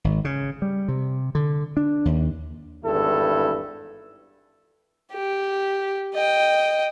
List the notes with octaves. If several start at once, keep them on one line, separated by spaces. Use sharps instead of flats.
G#1
C#3
G3
C3
D3
D4
D#2
G#1 E2 G2 E4 A4
G4
D#5 G5